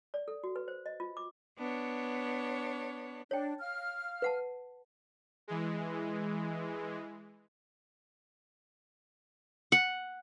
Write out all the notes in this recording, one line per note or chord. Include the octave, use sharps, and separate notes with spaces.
D5
A4
F#4
B4
C5
D#5
F4
D6
B3 D4 C#5
D4 C#5 G5
F5 F6
B4 F#5 A5
E3 G#3
F#5